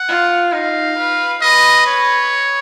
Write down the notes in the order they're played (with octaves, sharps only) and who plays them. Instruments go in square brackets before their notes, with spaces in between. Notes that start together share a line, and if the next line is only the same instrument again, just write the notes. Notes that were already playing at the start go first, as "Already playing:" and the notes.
Already playing: [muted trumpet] F#5
[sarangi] F4
[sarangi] D#4 [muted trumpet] F5
[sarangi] B4
[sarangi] B4 [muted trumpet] D#5
[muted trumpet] C#5